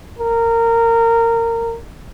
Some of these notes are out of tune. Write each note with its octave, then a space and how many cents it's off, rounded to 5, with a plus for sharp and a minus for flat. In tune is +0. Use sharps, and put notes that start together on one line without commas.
A#4 -20